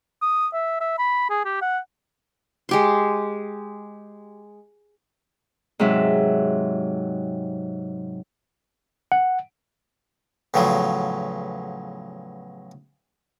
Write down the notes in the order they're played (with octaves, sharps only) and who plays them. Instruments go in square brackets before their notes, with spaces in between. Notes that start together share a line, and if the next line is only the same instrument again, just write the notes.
[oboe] D#6
E5
E5
B5
G#4
G4
F#5
[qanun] G#3 G4 C6
[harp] G#2 C3 F#3 E5
[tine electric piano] F#5
[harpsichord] E2 A2 C#3 F3 F#3